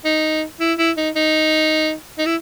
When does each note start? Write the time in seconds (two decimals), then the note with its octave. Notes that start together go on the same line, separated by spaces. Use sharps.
0.05 D#4
0.60 E4
0.78 E4
0.97 D#4
1.16 D#4
2.18 D#4
2.26 E4